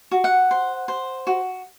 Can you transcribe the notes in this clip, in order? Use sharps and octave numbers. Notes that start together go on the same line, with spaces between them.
F#4
F#5
C5
C5
F#4